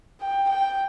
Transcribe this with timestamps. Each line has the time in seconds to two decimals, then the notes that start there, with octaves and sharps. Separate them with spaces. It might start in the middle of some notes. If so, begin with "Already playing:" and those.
0.21 G5
0.49 G5